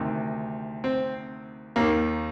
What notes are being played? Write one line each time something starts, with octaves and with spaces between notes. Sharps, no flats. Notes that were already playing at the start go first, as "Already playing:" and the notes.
Already playing: D2 C3 D#3
C4
D#2 D#3 A#3